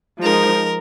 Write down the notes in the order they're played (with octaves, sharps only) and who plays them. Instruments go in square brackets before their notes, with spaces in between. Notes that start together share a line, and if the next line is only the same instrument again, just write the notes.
[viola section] F3 G#3 D#4 [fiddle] A#4